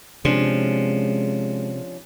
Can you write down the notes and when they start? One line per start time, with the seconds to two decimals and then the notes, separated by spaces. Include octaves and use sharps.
0.25 C3 F3 G#3 C#4 D4